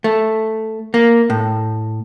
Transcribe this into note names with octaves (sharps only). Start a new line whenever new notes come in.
A3
A#3
A2